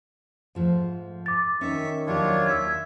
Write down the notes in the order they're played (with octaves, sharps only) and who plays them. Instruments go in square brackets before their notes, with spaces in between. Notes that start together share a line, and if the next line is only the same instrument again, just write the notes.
[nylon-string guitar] G#2 F3 A3
[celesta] D6 A6
[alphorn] D#3 [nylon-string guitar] C#4 [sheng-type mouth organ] E5 C#6
[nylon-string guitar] D#2 F#3 G4 [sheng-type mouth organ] D4 F4 C#5
[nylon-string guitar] D#2 [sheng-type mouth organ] E5 [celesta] E6 G#6